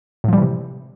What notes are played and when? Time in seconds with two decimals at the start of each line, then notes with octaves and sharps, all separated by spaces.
0.24 A2
0.28 F3
0.33 G3
0.37 E3
0.42 C3